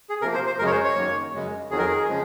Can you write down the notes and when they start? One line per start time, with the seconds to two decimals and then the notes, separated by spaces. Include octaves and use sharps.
0.10 G#4
0.22 C3 F3 A#3 A#4
0.34 C5
0.46 C5
0.59 F#2 C#3 G#3 A#4
0.67 C#5
0.72 C5
0.84 C#5
0.96 F#2 D#3 A#3
1.34 F#2 C#3 G#3
1.70 F2 D#3 F#3 G#4
1.78 A#4
1.86 G#4
2.08 C#3 F3 G#3